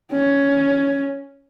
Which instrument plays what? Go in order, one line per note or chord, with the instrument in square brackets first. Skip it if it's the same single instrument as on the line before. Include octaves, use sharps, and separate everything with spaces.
[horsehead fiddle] C#4